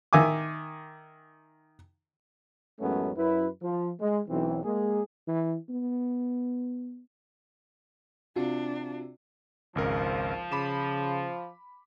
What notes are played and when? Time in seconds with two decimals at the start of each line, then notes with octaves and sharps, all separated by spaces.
0.13 D#3 E5 G#5 D6
2.78 A1 F#2 G#3 A3 B3 C#4
3.15 F#2 E4 B4
3.61 F3
3.99 G#3
4.28 B1 E3 C4
4.63 G#3 A#3 G#4
5.28 E3
5.69 B3
8.36 C3 D4 F4 F#4
9.75 G#1 C#2 F3 A#4
10.52 C#3 B5 D6 E7